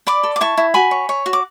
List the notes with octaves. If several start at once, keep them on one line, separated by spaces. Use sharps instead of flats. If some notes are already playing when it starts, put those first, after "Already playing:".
D5 B5 D6
A4
D6
E4 A5 C#6
E4
F#4 G#5 B5
C#5
C#5
F#4
D6